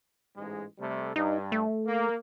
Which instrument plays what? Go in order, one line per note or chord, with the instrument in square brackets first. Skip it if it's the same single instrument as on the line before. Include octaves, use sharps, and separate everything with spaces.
[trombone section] A1 G#2 G#3
C3 G3 A3
[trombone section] G2 [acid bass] D#4
[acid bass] A3
[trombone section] A#3